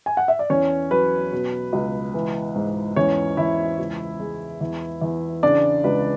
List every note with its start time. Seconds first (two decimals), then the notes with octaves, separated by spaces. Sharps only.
0.06 G#5
0.17 F#5
0.28 E5
0.39 D5
0.50 E2 C#4 C#5
0.91 F#3 B4
1.32 B2
1.73 C#2
2.14 E3
2.55 G#2
2.96 E2 C#4 C#5
3.37 E2 E4 E5
3.79 C#2
4.20 G#3
4.61 E2
5.01 E2
5.43 C#3 D4 D5
5.84 C#2 B4